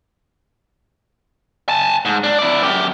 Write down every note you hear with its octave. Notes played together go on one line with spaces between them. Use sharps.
G#5 A5
G#2
D4
E4 D5
F#2 G4